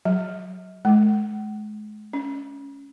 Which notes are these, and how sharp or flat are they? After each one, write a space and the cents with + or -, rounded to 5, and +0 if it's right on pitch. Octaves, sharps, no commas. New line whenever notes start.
F#3 +0
G#3 +35
C#4 +10